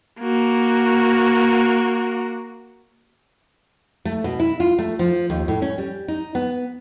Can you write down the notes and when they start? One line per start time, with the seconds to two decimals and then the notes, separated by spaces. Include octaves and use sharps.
0.21 A#3 F#4
4.05 A3
4.24 B2
4.40 E4
4.60 F4
4.79 A3
4.99 F3
5.30 D#2
5.48 A2
5.62 C#4
5.78 G3
6.08 D#4
6.35 B3